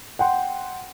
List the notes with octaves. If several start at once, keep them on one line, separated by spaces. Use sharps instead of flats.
F#5 G5 C6